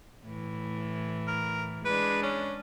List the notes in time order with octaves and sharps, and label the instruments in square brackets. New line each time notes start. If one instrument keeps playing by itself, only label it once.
[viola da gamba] A2 E3
[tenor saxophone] A#4
[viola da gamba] G#3 D4 [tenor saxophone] B4
[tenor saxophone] C#4